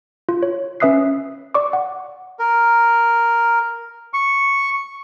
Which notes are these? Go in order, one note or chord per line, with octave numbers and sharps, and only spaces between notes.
F4
C#5
C#4 B4 E5 D#6 F#6 C7
D5 C#6 D6
F#5
A#4
C#6